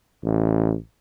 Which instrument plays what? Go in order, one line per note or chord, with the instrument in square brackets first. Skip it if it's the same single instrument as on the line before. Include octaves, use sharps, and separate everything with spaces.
[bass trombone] A1